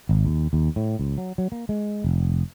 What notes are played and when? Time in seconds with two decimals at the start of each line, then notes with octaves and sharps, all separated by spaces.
0.09 G#1
0.25 D#2
0.53 D#2
0.76 A2
0.99 C#2
1.18 F#3
1.38 F#3
1.52 A#3
1.69 G#3
2.04 F1